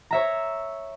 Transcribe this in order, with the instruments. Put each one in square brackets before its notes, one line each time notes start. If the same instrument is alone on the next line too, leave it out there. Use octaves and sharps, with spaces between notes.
[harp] C#5 E5 A#5